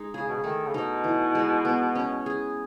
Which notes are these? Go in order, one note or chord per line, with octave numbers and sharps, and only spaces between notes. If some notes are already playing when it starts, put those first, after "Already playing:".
Already playing: G#3 D#4
C#3 G#4
B2
C#3
D#3 A3
C#3
B2 D#4
E3
G#3
B3
C#4
G#4